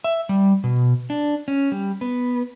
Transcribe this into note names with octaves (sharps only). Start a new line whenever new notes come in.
E5
G3
B2
D4
C#4
G3
B3